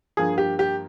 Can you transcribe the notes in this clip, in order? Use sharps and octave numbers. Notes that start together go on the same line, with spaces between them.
G2 F3 A#3 G#4
G4
G4